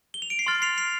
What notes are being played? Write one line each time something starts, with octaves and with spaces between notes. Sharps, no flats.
G7
F7
D7
C7
C6 F6 A6
C7 F7
C7 F7